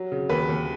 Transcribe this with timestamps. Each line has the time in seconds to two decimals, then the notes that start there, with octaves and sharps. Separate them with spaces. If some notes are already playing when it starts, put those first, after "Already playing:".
Already playing: F#3
0.12 C#3
0.30 D#2 B4
0.49 D#2